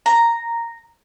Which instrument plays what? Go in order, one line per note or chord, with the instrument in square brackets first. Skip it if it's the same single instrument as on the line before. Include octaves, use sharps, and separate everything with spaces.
[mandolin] A#5